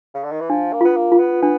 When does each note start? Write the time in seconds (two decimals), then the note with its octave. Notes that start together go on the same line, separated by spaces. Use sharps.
0.15 C#3
0.24 D3
0.32 D#3
0.41 E3
0.50 F3 D4
0.73 A#3
0.81 B3 F4
0.96 A#3
1.12 F4
1.19 B3
1.42 B3 D4